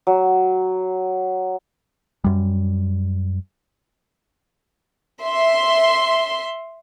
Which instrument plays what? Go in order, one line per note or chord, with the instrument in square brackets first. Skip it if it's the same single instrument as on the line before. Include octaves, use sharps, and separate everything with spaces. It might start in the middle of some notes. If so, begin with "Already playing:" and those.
[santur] F#3
[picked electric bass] F#2 G3
[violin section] E5 C6